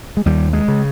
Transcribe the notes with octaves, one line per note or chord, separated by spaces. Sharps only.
G#3
D#2 G3
G#3
C#3